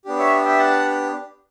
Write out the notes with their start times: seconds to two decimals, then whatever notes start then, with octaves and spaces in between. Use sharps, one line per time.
0.05 B3 D4 G4
0.19 C#5 E5
0.45 E5 G5
0.58 F#5 A5